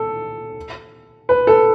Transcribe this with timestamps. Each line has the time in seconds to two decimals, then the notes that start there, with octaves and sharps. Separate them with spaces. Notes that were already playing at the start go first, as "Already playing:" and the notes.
Already playing: A4
1.29 B4
1.47 A4